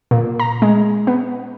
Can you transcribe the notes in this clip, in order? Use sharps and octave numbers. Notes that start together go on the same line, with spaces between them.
A#2
A#5
G#3
B3